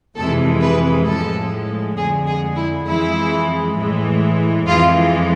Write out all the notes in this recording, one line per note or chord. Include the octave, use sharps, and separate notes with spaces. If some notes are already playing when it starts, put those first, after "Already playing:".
F2 C3 E3 G#3 A4
B4
A2 F3 G#3 A4
F2 D3 G#3 G#4
G#4
E4
F2 E3 G#3 E4
A2 E3 G#3
F2 E3 G#3 F4